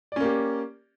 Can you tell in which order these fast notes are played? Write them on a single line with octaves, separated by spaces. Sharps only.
D5 C#4 A#3 G4